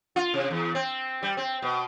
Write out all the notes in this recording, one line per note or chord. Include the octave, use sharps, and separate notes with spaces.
F4
C3
E2
C4
G3
C4
B2